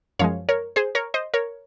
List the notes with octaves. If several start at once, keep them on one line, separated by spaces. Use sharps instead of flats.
F#2 F3 G#3 C#5 F5
A#4 C#5
G#4 C5
A#4 C#5
C5 D#5
A#4 C#5